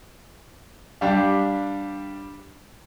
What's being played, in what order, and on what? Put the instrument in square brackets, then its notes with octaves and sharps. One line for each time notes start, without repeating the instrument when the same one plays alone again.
[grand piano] G3 D4 G4 F5